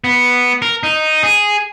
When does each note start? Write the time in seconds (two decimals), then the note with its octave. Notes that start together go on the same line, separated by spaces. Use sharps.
0.04 B3
0.62 A#4
0.83 D#4
1.23 G#4